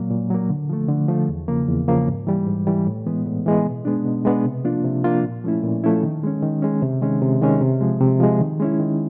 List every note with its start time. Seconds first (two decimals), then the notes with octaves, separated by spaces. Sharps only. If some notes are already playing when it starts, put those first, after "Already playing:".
Already playing: A#2 F#3 A#3
0.10 A#2
0.30 F#3 A#3
0.50 D3
0.69 F3 A3
0.89 D3
1.09 F3 A3
1.28 E2
1.48 C#3 F3 A#3
1.68 E2
1.88 C#3 F3 A#3
2.08 G#2
2.27 E3 G3
2.48 G#2
2.67 E3 G3
2.87 A2
3.06 E3 G#3 B3
3.26 A2
3.46 E3 G#3 B3
3.66 B2
3.85 G#3 B3 D4
4.06 B2
4.25 G#3 B3 D4
4.44 C3
4.65 F3 A#3 D4 F4
4.84 C3
5.04 F3 A#3 D4 F4
5.24 A#2
5.44 F3 A3 C#4 E4
5.63 A#2
5.84 F3 A3 C#4 E4
6.03 D#3
6.23 G#3 C#4
6.42 D#3
6.62 G#3 C#4
6.82 C3
7.02 D#3 G#3 C#4
7.22 C3
7.41 D#3 G#3 C#4
7.61 C3
7.81 F3 G#3
8.00 C3
8.20 F3 G#3
8.40 D#3
8.60 G#3 C#4 E4
8.80 D#3